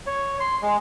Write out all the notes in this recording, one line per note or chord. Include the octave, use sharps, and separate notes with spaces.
C#5
C6
G#3